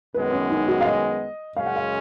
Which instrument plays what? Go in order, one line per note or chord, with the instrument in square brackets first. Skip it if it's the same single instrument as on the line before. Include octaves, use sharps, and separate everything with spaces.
[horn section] F#2 D#3 G#3 B3 [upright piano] B4
[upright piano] C#4
D#4
F#4
F5
D#5
[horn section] F#2 C#3 G#3 C#4 [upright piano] F5
[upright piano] F#5
F5